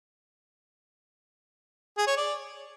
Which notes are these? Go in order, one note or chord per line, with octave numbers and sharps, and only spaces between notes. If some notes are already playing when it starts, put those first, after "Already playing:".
G#4
C#5
D5